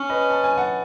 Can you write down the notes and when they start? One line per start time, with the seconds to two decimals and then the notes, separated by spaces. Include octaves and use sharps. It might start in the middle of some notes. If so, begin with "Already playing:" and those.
Already playing: C#4
0.09 B4 D#5
0.30 A5
0.44 G#5
0.57 F#5 A5